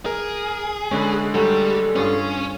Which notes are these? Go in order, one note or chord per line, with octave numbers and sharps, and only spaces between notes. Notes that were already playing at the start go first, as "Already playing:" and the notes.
G#4 A#4
D3 G#3 C#4 B4
F#3 G3 A3 A4
G2 C#4 F4 G#4